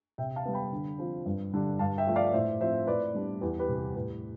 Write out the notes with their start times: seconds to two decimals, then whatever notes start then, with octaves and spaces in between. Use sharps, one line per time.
0.18 C3 E5 G5
0.36 F5 A5
0.45 G3 B3
0.54 G5 B5
0.72 D3
0.99 F3 C4
1.26 G2
1.53 D3 G3 D4
1.79 G2 F5 A5
1.98 E5 G5
2.07 F3 A3
2.16 D5 F5
2.33 A2 C5 E5
2.60 F3 C4 C5 E5
2.87 A2 B4 D5
3.14 G3 B3 D4
3.41 E2 G4 B4
3.59 G4 B4
3.68 C3 G3
3.77 G4
3.95 A2 G4 B4